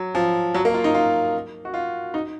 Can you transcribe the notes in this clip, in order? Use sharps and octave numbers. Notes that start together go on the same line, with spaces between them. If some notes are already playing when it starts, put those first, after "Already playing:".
Already playing: F#3
F3
F#3
A#3
F4
D#4
F4
F#4
F4
D#4